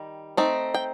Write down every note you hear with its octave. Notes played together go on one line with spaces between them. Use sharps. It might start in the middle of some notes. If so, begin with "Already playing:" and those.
Already playing: D#3 G3
A3 C4 D#4
G5